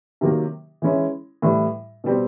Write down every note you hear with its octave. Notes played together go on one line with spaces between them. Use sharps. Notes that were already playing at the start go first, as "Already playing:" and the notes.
C3 D#3 F#3 A#3
E3 G#3 C#4 E4
A2 E3 G3
B2 G3 C4